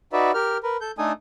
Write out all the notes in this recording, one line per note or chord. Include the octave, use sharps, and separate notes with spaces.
D#4 F#4 B4 D5 E5
G4 A#4 F6
A#4 B4
A4 G6
A3 D4 D#4 A4 G#5 D#6